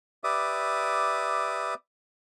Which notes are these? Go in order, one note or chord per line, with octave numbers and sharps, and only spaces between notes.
G4 B4 D5 E5 D6 D#6